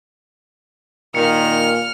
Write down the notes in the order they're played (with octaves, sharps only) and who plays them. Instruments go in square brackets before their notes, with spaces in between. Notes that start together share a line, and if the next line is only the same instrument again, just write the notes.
[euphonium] A#2 [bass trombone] D#3 [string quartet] F6 [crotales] C#7